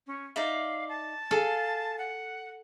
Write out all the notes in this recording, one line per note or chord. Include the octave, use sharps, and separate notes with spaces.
C#4
D#4 D5 E5 F5
A5
G#4 A4 F5
F#5